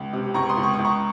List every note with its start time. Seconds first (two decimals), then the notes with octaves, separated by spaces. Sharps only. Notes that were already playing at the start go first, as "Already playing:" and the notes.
Already playing: C#2
0.13 C3
0.34 C#2 A#5 C#6
0.49 C6 D#6
0.57 C#2
0.63 C#6
0.74 D#6
0.79 C#2
0.85 A#5 C#6